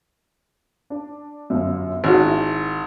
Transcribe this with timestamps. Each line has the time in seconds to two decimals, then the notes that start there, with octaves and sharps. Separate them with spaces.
0.90 D4
1.50 G1 F#2
2.04 G#1 C#4 F#4
2.28 E4